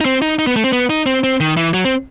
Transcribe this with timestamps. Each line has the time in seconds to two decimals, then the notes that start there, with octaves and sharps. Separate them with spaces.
0.01 D#4
0.05 C4
0.22 D#4
0.39 D#4
0.47 B3
0.56 A3
0.64 C4
0.73 B3
0.90 D#4
1.06 C4
1.24 C4
1.40 D#3
1.57 E3
1.74 F#3
1.85 C4